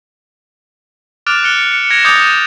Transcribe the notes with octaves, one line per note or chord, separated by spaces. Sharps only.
D6 F6 F#6 A6 D7 F7
F#6 C#7 G7
C#7
G#6 A#6 C#7 D7 E7 F7
D6 D#6 G6 A6 A#6 F7
D#7